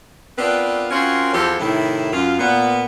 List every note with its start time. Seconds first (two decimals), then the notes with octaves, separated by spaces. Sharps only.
0.38 B3 C4 D4 F4 A#4 B4
0.90 C4 C#4 F4 F#4 A#4 C#5
1.34 E2 F3 C4 G4 A4
1.59 A2 C3 D#3 E4
2.12 F#2 F4
2.39 A#2 B3